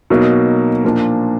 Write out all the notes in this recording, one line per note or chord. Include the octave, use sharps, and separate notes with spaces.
B2 F#3 A#3 D#4
A#2 F3 A#3 D4